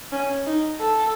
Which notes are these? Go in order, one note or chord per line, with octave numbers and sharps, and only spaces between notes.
C#4
D#4
A4